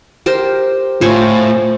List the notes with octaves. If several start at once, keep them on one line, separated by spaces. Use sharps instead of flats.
G4 A#4 C5
A2 F4 C5 C#5 G#5